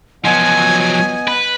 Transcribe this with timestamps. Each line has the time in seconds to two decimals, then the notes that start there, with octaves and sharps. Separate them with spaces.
0.24 F3 F#3 B3 D#5 F#5 G#5
1.28 B4